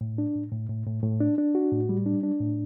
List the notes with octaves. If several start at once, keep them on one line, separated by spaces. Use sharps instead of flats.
A2
D4
A2
A2
A2
A2
A2
D4
D4
F#4
A2
G3
D4
D4
A2